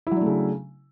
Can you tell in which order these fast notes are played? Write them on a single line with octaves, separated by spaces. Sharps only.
E4 F#3 D4 A3 C#3